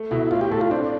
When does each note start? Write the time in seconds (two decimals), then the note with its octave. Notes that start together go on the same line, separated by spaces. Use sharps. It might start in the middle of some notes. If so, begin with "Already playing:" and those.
Already playing: A3
0.11 B2 E4
0.31 A2 F4
0.41 G4
0.51 A2 A4
0.61 F4
0.71 C4 D4